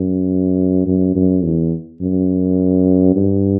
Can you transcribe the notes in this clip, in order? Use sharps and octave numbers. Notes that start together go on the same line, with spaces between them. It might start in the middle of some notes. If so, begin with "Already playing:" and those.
Already playing: F#2
F#2
F#2
E2
F#2
G2